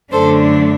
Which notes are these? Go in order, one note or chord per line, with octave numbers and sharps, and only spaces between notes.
F#2 D3 A3 D4 A4 C5